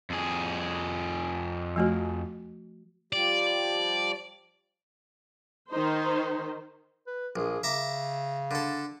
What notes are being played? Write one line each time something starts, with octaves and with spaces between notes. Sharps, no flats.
F2 G#4
F3 A3 F#4
F3 G3 G4 D5
D#3 D#4 C5
B4
A#1 G#4
C#3 E5 A#5 D6
D3 A4